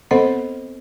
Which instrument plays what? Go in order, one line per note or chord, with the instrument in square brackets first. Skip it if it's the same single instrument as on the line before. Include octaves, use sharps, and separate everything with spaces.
[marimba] B3 C4 A4 C5 D#5 F#5